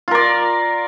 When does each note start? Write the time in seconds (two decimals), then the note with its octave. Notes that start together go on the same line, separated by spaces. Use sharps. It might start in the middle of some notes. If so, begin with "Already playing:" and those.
0.08 F4
0.11 A#4
0.15 D5